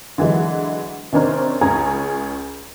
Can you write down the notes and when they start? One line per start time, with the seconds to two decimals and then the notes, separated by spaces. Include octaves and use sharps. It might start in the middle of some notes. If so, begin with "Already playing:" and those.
0.18 D3 E3 F#3 G#3
1.12 C3 D#3 C#4 D4 A#4 C5
1.61 C#2 C#3 C#4 G#4 G#5 A#5